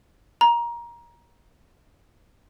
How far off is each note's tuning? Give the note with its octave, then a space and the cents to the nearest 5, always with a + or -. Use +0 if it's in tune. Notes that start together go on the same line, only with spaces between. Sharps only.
A#5 +20